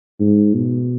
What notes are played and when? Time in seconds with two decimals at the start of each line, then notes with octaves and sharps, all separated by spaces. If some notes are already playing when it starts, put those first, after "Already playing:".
0.20 G#2
0.54 B2